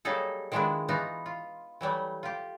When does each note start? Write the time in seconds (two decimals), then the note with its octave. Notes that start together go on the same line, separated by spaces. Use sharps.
0.05 F#3 G3 A#3 D#4 G#4 A4
0.52 D#3 F3 G#3 B3 D4 E4
0.89 E3 B3 D#4 F4 F#4
1.26 F4
1.81 E3 F#3 G3 A3
2.23 F4 G4